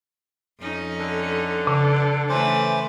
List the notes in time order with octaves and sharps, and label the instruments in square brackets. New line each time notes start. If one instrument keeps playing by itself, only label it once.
[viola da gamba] F2 C#4 D#4
[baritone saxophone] D3
[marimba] C#3
[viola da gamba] E3 A3 B4 [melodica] C#4 C5 D6